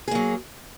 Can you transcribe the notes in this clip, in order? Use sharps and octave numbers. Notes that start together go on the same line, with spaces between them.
F#3 A#3 G#4